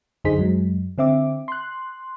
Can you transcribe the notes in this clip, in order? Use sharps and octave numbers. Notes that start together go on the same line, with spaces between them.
F#2 D3 D#4 G#4 C5 B6
F#2 F#3 G#3
D3 C4 E5 D6
C6 F#6